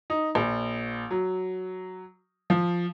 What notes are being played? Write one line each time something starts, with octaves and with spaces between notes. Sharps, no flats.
D#4
A#1
F#3
F3